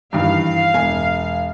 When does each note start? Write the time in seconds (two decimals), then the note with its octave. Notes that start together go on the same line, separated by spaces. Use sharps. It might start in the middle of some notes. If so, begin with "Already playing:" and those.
0.13 G2 D#3 E3 F5
0.74 E1 G#5